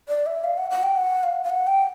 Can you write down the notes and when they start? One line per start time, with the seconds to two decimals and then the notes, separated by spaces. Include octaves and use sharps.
0.09 D5
0.26 E5
0.44 F5
0.58 F#5
0.71 F#5
0.83 G5
0.97 F#5
1.23 F5
1.44 F5
1.50 F#5
1.67 G5